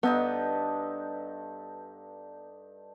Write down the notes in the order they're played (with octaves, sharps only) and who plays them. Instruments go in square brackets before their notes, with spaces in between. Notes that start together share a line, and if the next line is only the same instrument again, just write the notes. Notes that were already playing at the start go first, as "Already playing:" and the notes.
[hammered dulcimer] G2 D#4 A4 [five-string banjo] B3